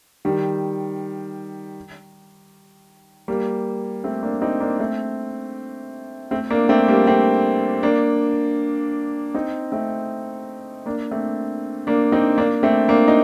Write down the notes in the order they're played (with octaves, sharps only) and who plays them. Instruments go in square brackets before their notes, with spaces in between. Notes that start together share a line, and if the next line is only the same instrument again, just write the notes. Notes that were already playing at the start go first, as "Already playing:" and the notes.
[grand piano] D#3 G3
G3 A#3
A3 C4
A#3 D4
C4 D#4
A#3 D4
A3 C4
A3 C4
A#3 D4
A3 C4
G3 A#3
A3 C4
A#3 D4
C4 D#4
A3 C4
A#3 D4
A3 C4
A#3 D4
C4 D#4
A#3 D4
A3 C4
A#3 D4
D#4